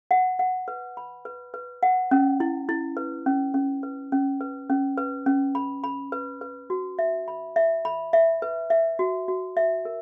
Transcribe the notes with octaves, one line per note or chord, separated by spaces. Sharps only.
F#5
F#5
B4
B5
B4
B4
F#5
C#4
E4
E4
B4
C#4
C#4
B4
C#4
B4
C#4
B4
C#4
B5
B5
B4
B4
F#4
E5
B5
E5
B5
E5
B4
E5
F#4
F#4
E5
A#4